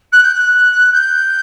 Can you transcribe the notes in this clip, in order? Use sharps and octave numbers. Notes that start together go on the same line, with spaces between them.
F#6
G6
F#6
G6